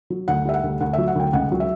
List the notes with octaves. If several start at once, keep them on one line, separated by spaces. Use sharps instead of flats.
F#3
D2 F#5
G3 E5
F#5
D2
D2 F#5
E5
F#3
F#5
D2 G5
C#2 F#5
F#3
E5